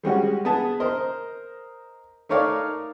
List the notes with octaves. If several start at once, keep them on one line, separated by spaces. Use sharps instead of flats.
G3 G#3 C#4 F#4
B3 G#4 A5
A#4 C5 D#5
A3 D#4 A#4 C#5 D5 F5